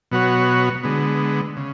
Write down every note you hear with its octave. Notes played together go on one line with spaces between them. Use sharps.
B2 F#3 B3 F#4 C#5
D3 G#3 B3
C#3